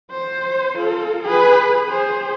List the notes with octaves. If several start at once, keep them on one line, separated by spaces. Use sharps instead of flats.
C5
F4 A4
G#4 B4
G#4 C5